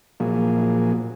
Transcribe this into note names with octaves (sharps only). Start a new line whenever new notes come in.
A#2 F3 F#3 A#3 G#4